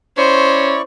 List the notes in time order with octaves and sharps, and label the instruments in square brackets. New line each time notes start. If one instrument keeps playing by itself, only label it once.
[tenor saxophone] C#4 [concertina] E4 D5 C#6 [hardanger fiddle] C5